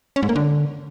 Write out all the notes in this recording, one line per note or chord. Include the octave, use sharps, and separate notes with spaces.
C#4
G#2
A#3
D3